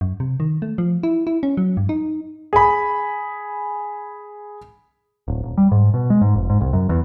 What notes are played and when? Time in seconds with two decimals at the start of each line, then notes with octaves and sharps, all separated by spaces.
0.01 F#2
0.20 C3
0.40 D#3
0.62 A3
0.78 F3
1.03 E4
1.27 E4
1.43 C#4
1.57 F#3
1.77 G2
1.89 D#4
2.53 G#4 B5
5.28 D1
5.44 D#1
5.58 G3
5.72 G#2
5.94 B2
6.10 G#3
6.22 G#2
6.34 F1
6.50 G#2
6.61 C2
6.73 F#2
6.89 E2